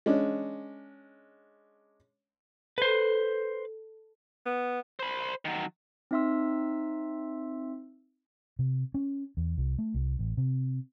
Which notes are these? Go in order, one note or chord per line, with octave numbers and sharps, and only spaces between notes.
G#3 C#4 D4
A4 B4 C5
B3
C5 B5
D#3 F#3
C4 D#4 E5 C6 E6
C3
C#4
E2
C2
A3
C2
A1
C3